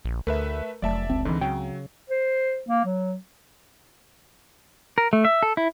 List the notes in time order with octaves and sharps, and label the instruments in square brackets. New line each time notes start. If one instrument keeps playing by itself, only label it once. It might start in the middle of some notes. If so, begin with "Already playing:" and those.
[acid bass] A#1
[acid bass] D2 [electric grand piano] A3 B4 E5 [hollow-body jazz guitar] A#4
[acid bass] F1 [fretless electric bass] F#3 A3 [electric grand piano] D5 E5 A5
[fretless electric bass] C#2 C4
[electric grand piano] G#2 [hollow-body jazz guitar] D3 E3
[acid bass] C#3 [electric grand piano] F#3 [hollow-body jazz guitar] G5
[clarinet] C5
A#3
F#3
[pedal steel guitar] A#4
A3
E5
A4
E4